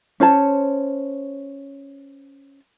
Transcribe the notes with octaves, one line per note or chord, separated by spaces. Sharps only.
C#4 C5 C#5 A5